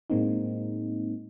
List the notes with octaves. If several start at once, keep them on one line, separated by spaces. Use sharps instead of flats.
A2 G#3 A#3 C4 D#4